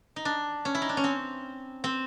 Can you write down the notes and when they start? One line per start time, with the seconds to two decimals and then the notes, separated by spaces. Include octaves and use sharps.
0.16 D#4
0.25 D4
0.65 C#4
0.75 E4
0.82 D#4
0.89 D4
0.97 C#4
1.04 C4
1.84 C4